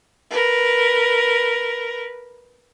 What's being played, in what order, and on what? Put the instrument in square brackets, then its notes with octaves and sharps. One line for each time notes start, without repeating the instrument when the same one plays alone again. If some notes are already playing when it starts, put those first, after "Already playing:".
[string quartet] A#4 B4